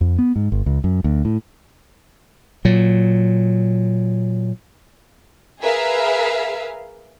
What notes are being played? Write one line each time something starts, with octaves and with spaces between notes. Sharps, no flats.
F2
B3
G#2
G1
C#2
F#2
D2
A2
A#2 F#3
G#4 A#4 B4 E5 F5